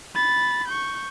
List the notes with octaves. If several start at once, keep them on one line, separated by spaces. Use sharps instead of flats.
B5 A6
C#6 G6